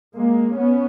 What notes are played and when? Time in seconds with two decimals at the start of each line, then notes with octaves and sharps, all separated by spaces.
0.14 G#3 A#3
0.56 B3 C#4